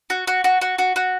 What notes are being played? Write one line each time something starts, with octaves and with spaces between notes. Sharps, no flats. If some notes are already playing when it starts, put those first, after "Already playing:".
F#4
F#4
F#4
F#4
F#4
F#4